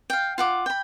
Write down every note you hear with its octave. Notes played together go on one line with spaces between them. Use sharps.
F5 G5
F4 F#5 D6
G5 B5